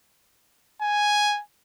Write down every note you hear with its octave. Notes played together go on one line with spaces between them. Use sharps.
G#5